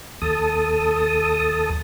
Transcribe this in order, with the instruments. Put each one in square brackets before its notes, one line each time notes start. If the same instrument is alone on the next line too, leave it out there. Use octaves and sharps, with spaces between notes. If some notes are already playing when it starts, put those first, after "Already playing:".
[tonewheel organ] D#2 A4 A5 D#6